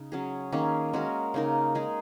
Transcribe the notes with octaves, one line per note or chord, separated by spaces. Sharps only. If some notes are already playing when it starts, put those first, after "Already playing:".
Already playing: C#3 D#4
F#3 C#4 G#4
D#3 A#3 C#4 G#4
G#3 C#4 F#4 A#4
C#3 A#3 D#4 A#4
G#3 D#4 G#4